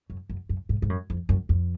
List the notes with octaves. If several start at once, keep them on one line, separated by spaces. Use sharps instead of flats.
F#2
F#2
F#2
G#2
G#2
F#2
F2
F#2
F2